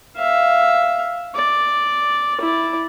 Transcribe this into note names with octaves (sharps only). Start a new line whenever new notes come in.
E5 F5
D5
E4 D5